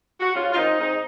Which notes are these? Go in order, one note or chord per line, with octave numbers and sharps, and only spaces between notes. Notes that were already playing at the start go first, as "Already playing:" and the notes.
F#4
G#2 C#4 F4
F4
D#3 C4 D#4
G#2 C4 D#4